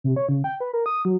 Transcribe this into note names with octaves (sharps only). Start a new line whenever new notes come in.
C3
C#5
C#3
G5
B4
A#4
D#6
F#3